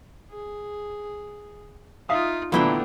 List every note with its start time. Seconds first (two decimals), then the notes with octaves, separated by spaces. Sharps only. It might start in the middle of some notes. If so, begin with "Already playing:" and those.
0.31 G#4
2.09 D#4 F4 E5 F5 D#6
2.52 A#2 D3 E3 A3 B3 D4 E4 G5